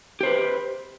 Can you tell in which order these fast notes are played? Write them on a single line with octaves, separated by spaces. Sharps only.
G4 C5 B4